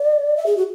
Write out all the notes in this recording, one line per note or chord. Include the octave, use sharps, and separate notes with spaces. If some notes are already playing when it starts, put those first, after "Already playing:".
Already playing: D5
E5
G#4
F#4